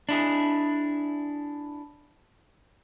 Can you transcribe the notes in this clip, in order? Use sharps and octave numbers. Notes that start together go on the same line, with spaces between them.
D4 E4 G#4